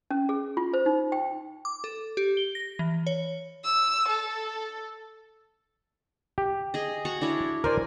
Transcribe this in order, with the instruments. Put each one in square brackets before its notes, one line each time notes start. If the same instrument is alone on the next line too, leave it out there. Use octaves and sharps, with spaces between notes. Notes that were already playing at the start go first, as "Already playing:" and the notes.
[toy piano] C#4
G#4
F4
C5
D#4
G5
[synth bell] D6
A4
G4
G7
A#6
E3
C#5
[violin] E6
A4
[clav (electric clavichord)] G4
[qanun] G#4 D#5
F#4 A#5 C#6
D4 E4 C#5
[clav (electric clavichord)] A#4 C5 D5 [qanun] G#5